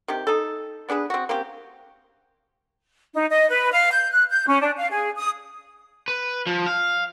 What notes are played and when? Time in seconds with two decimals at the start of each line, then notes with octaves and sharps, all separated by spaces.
0.08 C3 D#3 G4
0.27 D#4 A4
0.89 B3 D4 G#4 B4
1.10 C4 F#4
1.29 A#3 C4 C#4 G4
3.13 D#4
3.30 D#5
3.49 B4
3.72 F5
3.91 G6
4.11 F#6
4.30 G6
4.47 C#4
4.61 D4
4.77 F5
4.90 G#4
5.17 D#6
6.08 B4
6.47 F3
6.66 F5